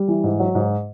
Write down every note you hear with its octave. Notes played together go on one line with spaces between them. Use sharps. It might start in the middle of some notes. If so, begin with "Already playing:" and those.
Already playing: G3
E3
G#2
F#3
G#2